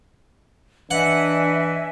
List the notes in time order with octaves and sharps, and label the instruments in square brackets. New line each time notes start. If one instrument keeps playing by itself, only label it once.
[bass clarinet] E3 [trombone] D4 [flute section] D#5 E5 G#5 [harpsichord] F#5